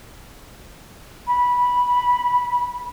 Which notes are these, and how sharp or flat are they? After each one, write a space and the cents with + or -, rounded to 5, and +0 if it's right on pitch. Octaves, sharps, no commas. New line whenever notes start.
B5 -15